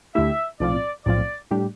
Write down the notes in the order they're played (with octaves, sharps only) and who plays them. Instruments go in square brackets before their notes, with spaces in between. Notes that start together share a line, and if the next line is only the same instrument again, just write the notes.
[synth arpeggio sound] D2 D3 A3 E4 G4 [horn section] E5
[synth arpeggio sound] B1 A2 F3 C4 F4 [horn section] D5
[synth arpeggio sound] B1 A2 F3 C4 F4 [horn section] D5
[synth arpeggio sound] A2 G3 D4 G4